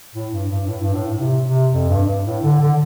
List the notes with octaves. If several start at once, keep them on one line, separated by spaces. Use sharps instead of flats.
A2
G2
G2
A2
G2
A2
A2
C3
C3
F2
G2
G2
A2
D3
D3